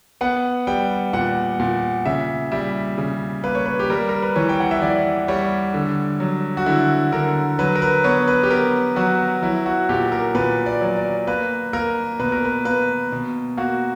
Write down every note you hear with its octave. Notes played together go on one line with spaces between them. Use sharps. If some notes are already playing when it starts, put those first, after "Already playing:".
B3 F#5
G3 G5
A#2 F#5
A#2
C#3 E5
G3 E5
C#3
A#3 B4
C#5
B4
G4
G3 A#4
A#4
B4
E3 C#5
G5
F#5
E5
E3 D5
G3 C#5
D3
F#3
F#4
D3 E4
D3 A#4
F#3 B4
A#4
B4
B3 C#5
B4
G4
B3 A#4
F#3 F#4
F#3 E4
F#4
A#2 G4
A#4
A#2 B4
D5
F#3
D5
A#3 B4
A#3 A#4
B2 B4
A#4
B4
A#3 B4
B2
A#3 F#4